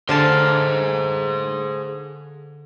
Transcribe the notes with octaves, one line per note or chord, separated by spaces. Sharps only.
D3 G#4 C5 F5 A5